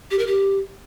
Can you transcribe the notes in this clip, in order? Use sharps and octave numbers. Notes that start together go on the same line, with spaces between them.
G4
A#4
G4